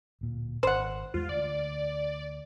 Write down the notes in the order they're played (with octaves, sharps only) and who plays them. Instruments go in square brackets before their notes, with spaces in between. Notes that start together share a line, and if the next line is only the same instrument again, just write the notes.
[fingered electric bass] D1 A#2
[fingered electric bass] G#1 [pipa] C5 F#5
[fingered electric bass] E2 G#3 [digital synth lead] F4
[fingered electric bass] D2 [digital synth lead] D5